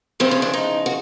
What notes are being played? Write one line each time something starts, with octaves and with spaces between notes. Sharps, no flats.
E2 C#3 F3 C4
C#4
D4
D#4
F#4